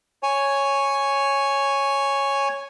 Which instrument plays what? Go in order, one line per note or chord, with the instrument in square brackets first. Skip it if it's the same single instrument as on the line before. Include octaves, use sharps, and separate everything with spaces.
[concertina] C#5 G#5